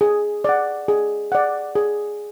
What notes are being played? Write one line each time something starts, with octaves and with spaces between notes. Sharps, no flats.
G#4
D5 F#5
G#4
D5 F#5
G#4